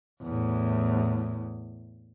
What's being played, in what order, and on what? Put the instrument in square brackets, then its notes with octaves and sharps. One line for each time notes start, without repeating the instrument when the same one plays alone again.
[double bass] E2 A2